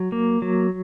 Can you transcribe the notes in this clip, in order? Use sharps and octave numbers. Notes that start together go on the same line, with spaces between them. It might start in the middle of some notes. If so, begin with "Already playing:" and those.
Already playing: F#3
A#3
F#3